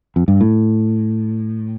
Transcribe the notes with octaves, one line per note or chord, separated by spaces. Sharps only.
F2
G2
A2